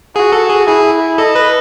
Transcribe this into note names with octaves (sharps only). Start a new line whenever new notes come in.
F#4 G#4
A4
G#4
E4 G#4
A4 D#5
B4